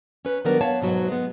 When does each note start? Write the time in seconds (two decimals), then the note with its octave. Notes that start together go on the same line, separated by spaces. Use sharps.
0.25 C#4 B4
0.45 D#3 F#3 G3 B3 D4 A#4
0.61 B3 C#5 F5 A5
0.82 G#2 B2 F#3 B3
1.08 G#3 B3